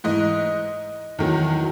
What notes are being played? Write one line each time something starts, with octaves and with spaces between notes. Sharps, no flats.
G#2 E3 D#5
E2 D#3 F#3